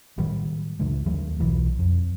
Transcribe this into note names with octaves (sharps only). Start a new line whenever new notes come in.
A2 D#3 F#3 G3
C#2 D3 G#3
D#2 F#3 A3
B1 E3 F#3
F2